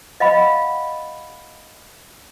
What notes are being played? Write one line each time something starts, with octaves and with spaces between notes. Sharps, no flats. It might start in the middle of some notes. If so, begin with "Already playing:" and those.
D#5 F5 F#5 B5